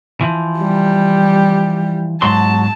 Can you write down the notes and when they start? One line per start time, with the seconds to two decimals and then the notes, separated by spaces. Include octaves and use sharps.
0.21 E3 F3
0.59 G3
2.22 G#2 F#3 A5 C6